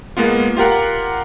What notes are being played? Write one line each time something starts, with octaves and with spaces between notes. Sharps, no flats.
G#3 A#3 B3 F4
F4 G4 A#4 F#5